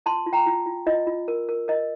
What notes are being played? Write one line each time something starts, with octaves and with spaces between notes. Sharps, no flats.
F4 A5 C6
F4
G5 A#5
F4
F4
F4 D#5
F4
A#4
A#4
A#4 D#5